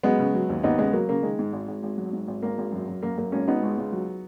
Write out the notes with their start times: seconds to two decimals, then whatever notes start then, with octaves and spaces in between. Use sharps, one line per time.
0.03 F#3 G#3 B3
0.19 C#3
0.34 F#3
0.49 D#2
0.64 D#2 B3 D#4
0.78 C#3 G#3 B3
0.93 F#3 A#3
1.09 C#3 A#3
1.23 D#3 G#3
1.39 G#2
1.53 G#1
1.68 G#1
1.83 G#1
1.98 F#3
2.13 G#2
2.28 G#1
2.43 G#1 A#3
2.58 G#1
2.72 F#2
2.88 F#2
3.03 F#2 A#3
3.18 F#2 A#3
3.32 G#1 A#3 C#4
3.47 G#1 B3 D#4
3.63 C#2
3.78 C#2
3.93 F#3